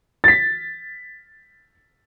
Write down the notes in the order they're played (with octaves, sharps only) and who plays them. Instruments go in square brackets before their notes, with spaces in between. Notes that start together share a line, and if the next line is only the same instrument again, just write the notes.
[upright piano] A6 B6